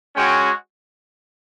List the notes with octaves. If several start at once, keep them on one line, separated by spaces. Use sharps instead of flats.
G#3 C#4 F#4 G5